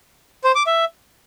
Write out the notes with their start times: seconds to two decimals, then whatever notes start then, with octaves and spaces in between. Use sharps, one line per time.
0.44 C5
0.55 D6
0.67 E5